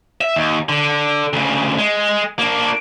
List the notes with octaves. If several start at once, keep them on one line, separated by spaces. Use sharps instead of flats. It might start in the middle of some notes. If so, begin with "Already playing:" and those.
E5
D#2
D3
D2 C#3
G#3
A#3 D4